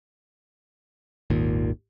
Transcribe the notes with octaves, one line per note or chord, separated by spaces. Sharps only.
G#1 D#2 A#2